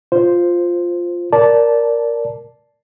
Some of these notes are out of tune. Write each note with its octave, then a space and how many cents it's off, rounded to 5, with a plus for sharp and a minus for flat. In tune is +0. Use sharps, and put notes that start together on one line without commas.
F4 +0 C5 +0
A#4 +0 D5 -10 A5 -5